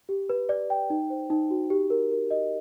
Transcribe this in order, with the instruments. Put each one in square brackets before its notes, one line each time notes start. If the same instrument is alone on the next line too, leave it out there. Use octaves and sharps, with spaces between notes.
[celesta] G4
B4
D5
G5
D#4
C5
D#4
F#4
G4
A#4
A#4
D#5